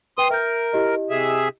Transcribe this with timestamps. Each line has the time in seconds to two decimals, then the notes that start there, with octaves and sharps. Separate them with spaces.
0.18 B4 G5 C6 D#6
0.30 A#4 E5 G6
0.73 E4 G4 D#5
1.10 C3 G#4 E5